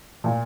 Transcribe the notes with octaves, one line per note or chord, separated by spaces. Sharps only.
A#2